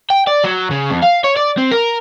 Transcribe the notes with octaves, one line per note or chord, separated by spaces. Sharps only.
G5
D5
F#3
C#3
F2
F5
C#5
D5
C4
A#4